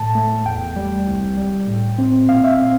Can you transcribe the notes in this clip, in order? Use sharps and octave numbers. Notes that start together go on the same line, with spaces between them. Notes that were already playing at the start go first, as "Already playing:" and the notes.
Already playing: A2 A5
A3
E2 G5
G3
C2
G3
A2
C4
A#2 F5
E5
F5
C4